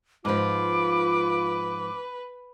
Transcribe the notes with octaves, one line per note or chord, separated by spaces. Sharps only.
G#2 F3 F4 B4 D6